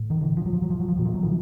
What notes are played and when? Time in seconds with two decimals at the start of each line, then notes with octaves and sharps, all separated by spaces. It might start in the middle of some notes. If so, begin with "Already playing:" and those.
Already playing: A2
0.10 D#3
0.21 D3 E3
0.37 F3
0.45 F#3
0.53 F3
0.62 F#3
0.70 F3
0.80 F#3
0.88 F3
0.96 A#2 F#3
1.05 F3
1.14 F#3
1.22 D#3 F3